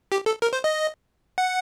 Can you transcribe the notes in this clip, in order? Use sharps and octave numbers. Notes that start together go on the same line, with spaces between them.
G4
A4
A#4
C5
D#5
F#5